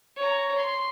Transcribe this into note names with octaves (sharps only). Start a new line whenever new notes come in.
C#5 A#5
C6